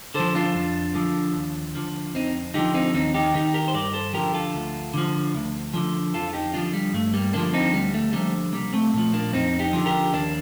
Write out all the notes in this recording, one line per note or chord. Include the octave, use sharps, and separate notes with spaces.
D3 F3 A4 C5
D4 F4
F2
D3 F3
D#2
D3 F3
F2 C4 D#4
D3 F3 D#4 G4
C4 D#4
D#2 C4 D#4
D#4 G4
D#3 D#4 G4
G4 A#4
C5
G2 A#4 D5
A4 C5
D3 F3 G4 A#4
F4 A4
D2
D3 F3
D2
D3 F3
F2 F4 A4
F4
D#4 G4
D3 F3 D4 F4
G3
G2 A3
G3 A#3
D3 F3 A#3 D4
C4 D#4
D2 G3
A3
D3 F3 G3 A#3
C2 G3 A#3
A3 C4
A#2 F3 A3
A#3 D4
F2 C4 D#4
D#4 G4
D3 F3
G4 A#4
D#2 A#3 D4